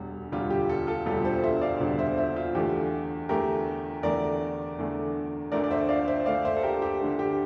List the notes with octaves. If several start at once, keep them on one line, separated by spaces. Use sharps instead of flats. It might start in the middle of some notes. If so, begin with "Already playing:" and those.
Already playing: E1 D2 D3 G3
E1 D2 D3 G3 F4
G4
F4 A4
F4 A4
E1 D2 D3 G3 F4 A4
A4 C5
C5 E5
D5 F5
E1 D2 D3 G3
C5 E5
C5 E5
F4
E2 D3 A3 G4
E2 D3 A3 G4 A#4
E2 D3 A3 A#4 D5
E2 D3 A3
D2 D3 A3 A#4 D5
D5
C5 E5
D5 F5
C5 E5
D2 D3 A3 D5 F5
C5 E5
A4
G4 A#4
G4
D2 D3 A3
G4